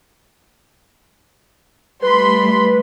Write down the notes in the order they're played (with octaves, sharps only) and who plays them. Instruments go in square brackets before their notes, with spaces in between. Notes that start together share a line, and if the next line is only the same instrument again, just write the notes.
[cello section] G3 A3 [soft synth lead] B4 [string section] B5 C6